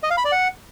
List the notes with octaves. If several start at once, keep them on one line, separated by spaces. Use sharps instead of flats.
D#5
F5
B5
D5
F#5